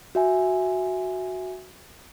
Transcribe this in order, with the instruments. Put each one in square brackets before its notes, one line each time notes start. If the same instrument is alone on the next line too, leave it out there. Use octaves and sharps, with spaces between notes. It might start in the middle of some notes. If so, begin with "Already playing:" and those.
[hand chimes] F#4 E5 G#5